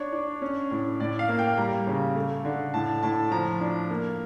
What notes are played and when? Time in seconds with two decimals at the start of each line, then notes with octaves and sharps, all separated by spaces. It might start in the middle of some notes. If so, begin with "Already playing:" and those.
Already playing: D4 C#5
0.13 D4
0.42 C#4
0.71 A2
1.00 A2 D5
1.19 F5
1.28 A#3
1.39 G5
1.58 G3 A#5
1.87 C#3
2.15 A3
2.45 D3
2.74 A2 A5
3.02 A2 A5
3.31 F3 A#5
3.61 D4
3.90 A#3